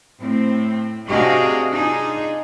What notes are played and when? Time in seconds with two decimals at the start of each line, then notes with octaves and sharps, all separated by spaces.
0.21 A2 C4
1.09 C3 D4 F#4 G#4 D#5 F5
1.70 D4 D#4 F4 G#4